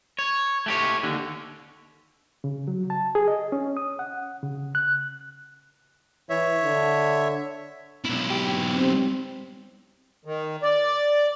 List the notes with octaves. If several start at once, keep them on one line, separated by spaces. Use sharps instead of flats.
C#5
A3 G4 C#5
D#2 D3
C#3
F#3
A5
G#4
D#5
C#4
D#6
F#5
C#3
F#6
E3 C#5 E5
D3
B1 E4
G4
C4
D#3
D5